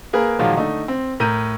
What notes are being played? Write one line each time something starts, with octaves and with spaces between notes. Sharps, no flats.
A#3 G#4 A#4 B4
A#2 D#3 F3 F#3 G#3 A#3
D3 A3 D#4
C4
A2 A#4 A#5 G6 D#7